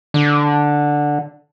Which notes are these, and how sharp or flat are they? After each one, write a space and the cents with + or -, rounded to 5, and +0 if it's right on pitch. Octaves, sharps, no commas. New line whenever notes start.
D3 +0